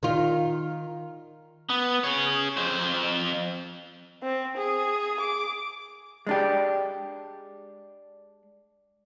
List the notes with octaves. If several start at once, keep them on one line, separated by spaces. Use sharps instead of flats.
D#3 F4
B3
G#4 C#5
F2 C5
C4
G#4
D6
G#3 D4 G4